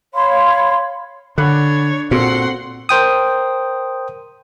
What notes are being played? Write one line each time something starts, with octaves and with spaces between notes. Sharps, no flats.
C#5 F5 B5 C6
D3 D4 C#5 F#5 B5 F#6
A#2 C4 F#4 A4 F#5 C6
A#4 C5 G5 D#6